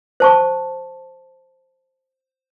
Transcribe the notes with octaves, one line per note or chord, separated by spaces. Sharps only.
C5 A5 C#6